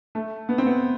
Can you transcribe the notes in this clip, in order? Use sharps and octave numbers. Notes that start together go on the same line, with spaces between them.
A3
B3
C4
B3